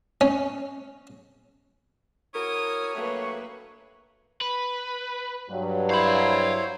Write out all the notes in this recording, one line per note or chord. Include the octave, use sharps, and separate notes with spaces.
C#4
E4 F#4 A#4 C#5 D#6
G2 F#3 A3 A#3 B4
B4
G2 F#3
E4 C5 C#5 F5 B5